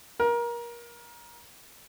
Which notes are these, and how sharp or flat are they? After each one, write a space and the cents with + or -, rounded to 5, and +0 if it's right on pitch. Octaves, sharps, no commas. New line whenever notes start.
A#4 +25